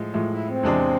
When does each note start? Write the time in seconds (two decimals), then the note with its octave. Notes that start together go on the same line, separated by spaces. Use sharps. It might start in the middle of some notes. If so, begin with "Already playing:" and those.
Already playing: A2 F3 G#3
0.14 A2 F3 G#3
0.31 E4
0.47 C4
0.63 E2 C3 G#3 D4 G#4